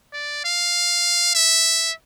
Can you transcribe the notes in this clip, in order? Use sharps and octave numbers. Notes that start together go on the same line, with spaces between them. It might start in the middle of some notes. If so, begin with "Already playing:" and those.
D5
F5
E5